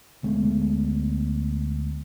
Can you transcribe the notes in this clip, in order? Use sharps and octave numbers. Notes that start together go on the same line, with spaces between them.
D2 G#3 A3 B3